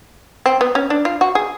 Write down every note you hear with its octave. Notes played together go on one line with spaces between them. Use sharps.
C4
B3
C#4
D4
F4
F#4
G#4